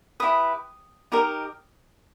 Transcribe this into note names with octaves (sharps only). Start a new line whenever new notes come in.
E4 G4 B4 D#6
D#4 G4 A#4